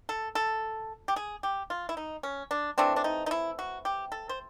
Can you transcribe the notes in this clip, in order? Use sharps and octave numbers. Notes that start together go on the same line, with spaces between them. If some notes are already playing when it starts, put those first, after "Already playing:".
A4
A4
G4
G#4
G4
F4
E4
D#4
C#4
D4
E3 A3 C4 D4
D4
D#4
D#4
E4
F#4
G4
A4
C5